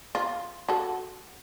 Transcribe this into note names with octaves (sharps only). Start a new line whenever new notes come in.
F4
F#4 A4